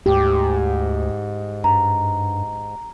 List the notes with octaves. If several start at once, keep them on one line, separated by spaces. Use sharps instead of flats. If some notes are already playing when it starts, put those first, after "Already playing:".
D2 G#2 G4
G2 A#5